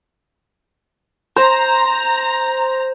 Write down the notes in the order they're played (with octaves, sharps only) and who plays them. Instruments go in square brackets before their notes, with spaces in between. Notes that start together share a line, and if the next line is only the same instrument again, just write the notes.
[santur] C5 [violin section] A#5